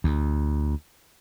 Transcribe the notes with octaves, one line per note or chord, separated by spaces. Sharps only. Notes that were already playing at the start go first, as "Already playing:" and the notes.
D2